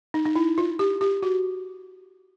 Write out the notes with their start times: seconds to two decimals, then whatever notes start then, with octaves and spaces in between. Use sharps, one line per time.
0.14 D#4
0.25 D#4
0.36 E4
0.58 F4
0.79 G4
1.01 G4
1.22 F#4